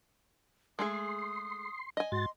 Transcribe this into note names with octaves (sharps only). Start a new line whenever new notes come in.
G#3 A3 G#4 C6 D#6
D#5 G#5
G#2 F#4 C6 A6